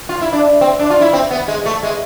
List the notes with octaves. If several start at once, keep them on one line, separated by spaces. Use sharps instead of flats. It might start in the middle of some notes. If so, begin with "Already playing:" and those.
F4
E4
D4
C4
D4
F4
E4
C4
B3
G#3
A3
G#3